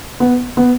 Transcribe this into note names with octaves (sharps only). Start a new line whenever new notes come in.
B3
B3